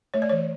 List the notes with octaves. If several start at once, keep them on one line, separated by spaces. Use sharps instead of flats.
A3 C#5
D5
E3 C#5